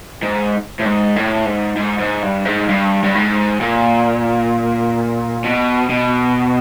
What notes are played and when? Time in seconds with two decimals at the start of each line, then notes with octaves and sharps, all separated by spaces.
0.23 G#2
0.79 A2
0.85 G#2
1.16 A2
1.45 G#2
1.77 G#2
1.99 G#2
2.23 G2
2.45 G#2
2.69 G2
3.03 G2
3.15 G#2
3.60 A#2
5.44 B2
5.89 B2